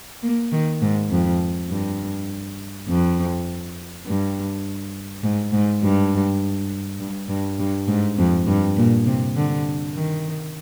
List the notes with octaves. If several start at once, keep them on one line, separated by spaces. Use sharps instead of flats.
A#3
D#3
G#2
F2
G2
F2
G2
G#2
G#2
G2
G2
G2
G2
G#2
F2
G2
A#2
C3
D3
D#3